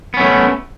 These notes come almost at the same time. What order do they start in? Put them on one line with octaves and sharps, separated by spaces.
B3 C#4 A3